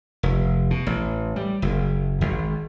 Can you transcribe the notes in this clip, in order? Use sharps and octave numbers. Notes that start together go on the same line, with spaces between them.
F1
B2
A1
G3
F#1
G#1